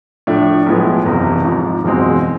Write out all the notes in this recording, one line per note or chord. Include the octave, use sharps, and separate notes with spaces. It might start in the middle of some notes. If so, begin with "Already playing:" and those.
A2 F3 A3 D4
B1 A2 F3 G#3 B3
F#1 E2 C3
G#1 G#2 F3
F#1 E2 B2 G#3 C4